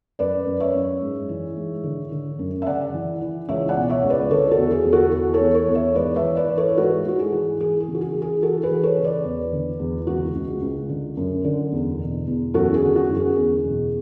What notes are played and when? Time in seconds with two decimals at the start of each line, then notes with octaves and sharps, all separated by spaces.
0.19 F#2 B4 D5
0.46 F#2
0.60 C#5 E5
0.74 F#2
1.01 G#2
1.29 E3
1.56 G#2
1.84 D3
2.11 D3
2.39 F#2
2.62 E5
2.66 C#3 D5 F#5
2.94 E3
3.21 E3
3.48 C#2 C#5 E5
3.69 D5 F#5
3.76 B2
3.90 C#5 E5
4.04 C#2
4.10 B4 D5
4.31 D3 A4 C#5
4.51 F#4 A4
4.58 E2
4.72 G#4
4.86 E2
4.93 F#4 A4
5.13 E3
5.34 A4 C#5
5.41 E2
5.54 A4 C#5
5.68 E2
5.75 C#5 E5
5.95 G#2 B4 D5
6.16 C#5 E5
6.22 E3
6.37 B4 D5
6.50 E3
6.57 A4 C#5
6.69 B4
6.77 G#2 F#4 A4
7.05 G#2 F#4
7.19 G#4
7.32 E3
7.60 E3 G#4
7.80 G#4
7.88 C#3
7.95 F#4
8.01 G#4
8.15 E3
8.22 G#4
8.42 E3 F#4 A4
8.63 G#4 B4
8.70 E3
8.83 A4 C#5
8.98 C#3
9.04 B4 D5
9.24 E2
9.52 D3
9.79 E2
10.07 C#2 F#4
10.35 C#2
10.62 C#2
10.89 D3
11.17 F#2
11.44 D3
11.72 E2
11.99 B2
12.27 E2
12.54 F#2 F#4 A4
12.74 G#4
12.81 D3
12.96 F#4
13.09 F#2
13.16 G#4
13.36 E2 G#4
13.64 B2